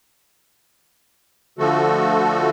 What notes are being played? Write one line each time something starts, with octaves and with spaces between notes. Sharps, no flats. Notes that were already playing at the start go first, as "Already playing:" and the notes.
D3 F3 A3 F#4 A4